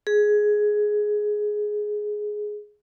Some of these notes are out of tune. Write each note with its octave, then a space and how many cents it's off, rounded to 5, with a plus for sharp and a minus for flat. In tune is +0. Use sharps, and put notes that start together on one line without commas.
G#4 +10